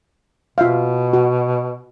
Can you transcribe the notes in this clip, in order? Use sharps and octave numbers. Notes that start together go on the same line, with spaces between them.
B2 F4 E5 F5
F#4